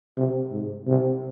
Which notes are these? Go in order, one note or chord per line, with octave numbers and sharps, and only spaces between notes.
C3
G#2
C3